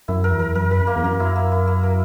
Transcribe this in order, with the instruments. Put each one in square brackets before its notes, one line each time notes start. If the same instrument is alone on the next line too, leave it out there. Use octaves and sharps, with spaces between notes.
[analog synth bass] F#2 [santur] E4
[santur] A#4
[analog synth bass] E2
[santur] A#4
[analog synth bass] F#2 [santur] A#4
[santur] A#4
A#3
[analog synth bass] E2
[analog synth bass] F#2 [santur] A#3
[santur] E4
A#3
E4
A#3
A#4